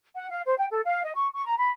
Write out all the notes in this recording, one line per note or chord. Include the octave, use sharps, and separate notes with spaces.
F#5
F5
C5
G5
A4
F5
D#5
C#6
C#6
A#5
B5